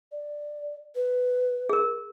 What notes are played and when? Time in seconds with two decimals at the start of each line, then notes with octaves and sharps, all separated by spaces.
0.12 D5
0.95 B4
1.69 G#4 A#4